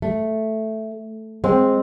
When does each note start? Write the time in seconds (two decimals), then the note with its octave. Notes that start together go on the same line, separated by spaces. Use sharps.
0.02 A3
1.44 G#3 C4